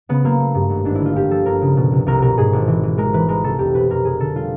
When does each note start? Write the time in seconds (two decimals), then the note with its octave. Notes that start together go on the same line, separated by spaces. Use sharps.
0.09 C#3 B3
0.24 F#3 A#3
0.40 A3
0.55 G2
0.70 G#1
0.85 G#1 D4
0.95 E4
1.00 D3
1.06 F4
1.16 G1 G4
1.31 F3 A4
1.46 G1 A#4
1.62 C#3
1.77 B2
1.92 C2
2.07 C2 A#4
2.22 B2 A#4
2.38 G#2 G#4
2.53 G#1
2.68 E3
2.83 E3
2.98 G#3 A#4
3.14 E3 B4
3.28 G#3 A#4
3.44 C2 A4
3.59 F1 G4
3.75 B2 B4
3.90 F1 A#4
4.04 F1 G#4
4.20 D3 A4
4.35 G3 F4